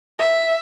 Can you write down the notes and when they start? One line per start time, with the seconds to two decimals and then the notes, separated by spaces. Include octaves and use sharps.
0.19 E5